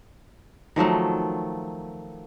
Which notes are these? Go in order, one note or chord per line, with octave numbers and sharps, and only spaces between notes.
D#3 F3 F#3 A3